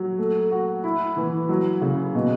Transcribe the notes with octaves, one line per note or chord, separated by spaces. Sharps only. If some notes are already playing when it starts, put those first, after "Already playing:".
Already playing: F#3
A3
F#4
E4
E3
F#3
C#3
B2